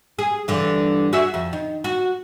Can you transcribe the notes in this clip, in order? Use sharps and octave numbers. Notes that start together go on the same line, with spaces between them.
G#4
G2 D3 E3
F#4 G#4 E5
F2
D#3
F#4